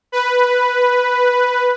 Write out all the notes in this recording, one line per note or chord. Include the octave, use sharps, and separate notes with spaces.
B4